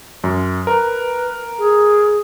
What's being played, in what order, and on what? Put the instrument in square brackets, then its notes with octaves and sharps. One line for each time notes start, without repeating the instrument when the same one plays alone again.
[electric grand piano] F#2
[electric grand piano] A#4 [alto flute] B4
[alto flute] G#4